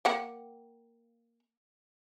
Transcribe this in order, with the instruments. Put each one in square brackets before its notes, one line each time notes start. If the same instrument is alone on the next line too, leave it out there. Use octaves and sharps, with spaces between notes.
[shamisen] A#3 F#5 G5